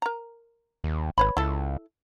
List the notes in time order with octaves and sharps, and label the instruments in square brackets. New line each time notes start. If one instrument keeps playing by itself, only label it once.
[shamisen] A#4 A#5
[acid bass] D#2
[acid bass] G#1 [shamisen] B4 C#5 B5
[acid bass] C#2 [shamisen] E4 A4